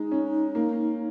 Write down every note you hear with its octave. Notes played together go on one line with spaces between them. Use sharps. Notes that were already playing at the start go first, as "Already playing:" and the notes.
Already playing: G#3 D#4
C#4
A#3